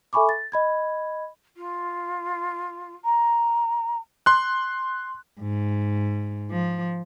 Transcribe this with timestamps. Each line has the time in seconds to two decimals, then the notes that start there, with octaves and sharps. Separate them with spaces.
0.13 A4 E5 G#5 B5 C#6 D6
0.29 A6
0.52 D#5 B5 G#6
1.57 F4
3.04 A#5
4.26 C6 F#6
5.41 G#2
6.51 F3